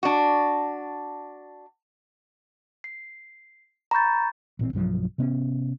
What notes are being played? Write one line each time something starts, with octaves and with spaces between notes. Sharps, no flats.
D4 F#4
C7
A#5 B5 C#6 G6 A6
A1 A#2 C4
B1 G2 F3 F#3
C3 B3 C#4